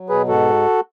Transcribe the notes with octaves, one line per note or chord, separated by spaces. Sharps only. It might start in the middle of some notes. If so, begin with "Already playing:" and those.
Already playing: F#3
B2 G#4 B4
G#2 F#4 A4